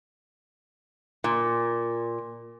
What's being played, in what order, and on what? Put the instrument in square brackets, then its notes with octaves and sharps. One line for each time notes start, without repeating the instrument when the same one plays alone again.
[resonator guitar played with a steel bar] A#2